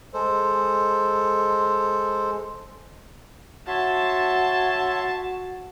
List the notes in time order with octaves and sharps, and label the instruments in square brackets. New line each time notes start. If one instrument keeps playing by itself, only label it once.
[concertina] G#3 A4 C5
[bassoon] F#4 [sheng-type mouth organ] C#5 E5 C6 [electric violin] A5